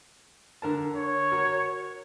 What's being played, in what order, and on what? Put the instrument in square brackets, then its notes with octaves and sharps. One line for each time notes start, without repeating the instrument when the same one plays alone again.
[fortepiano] D3 A#4 A5
[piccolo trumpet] C#5
[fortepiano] F#4 A#4